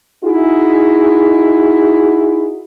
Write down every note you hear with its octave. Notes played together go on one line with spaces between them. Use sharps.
D#4 E4 F#4 G#4